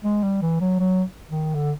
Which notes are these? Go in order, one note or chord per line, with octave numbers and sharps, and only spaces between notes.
G#3
G3
E3
F#3
F#3
D#3
D3